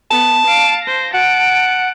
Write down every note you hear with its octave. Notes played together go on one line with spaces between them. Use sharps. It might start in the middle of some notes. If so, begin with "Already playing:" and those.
B3 A5
F5 D7
C5 A#6
F#5 A5 D7